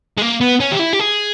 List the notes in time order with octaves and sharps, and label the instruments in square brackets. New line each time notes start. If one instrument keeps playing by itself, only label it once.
[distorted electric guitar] G#3
A#3
B3
C#4
G4
E4
G4
G#4